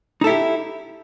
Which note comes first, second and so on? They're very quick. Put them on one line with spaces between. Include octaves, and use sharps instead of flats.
D#4 A4 E4 G4